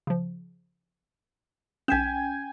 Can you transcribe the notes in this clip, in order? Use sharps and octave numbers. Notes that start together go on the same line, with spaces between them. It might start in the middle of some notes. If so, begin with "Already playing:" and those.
C#3 F3
B1 C#4 G5 G#5 B6 E7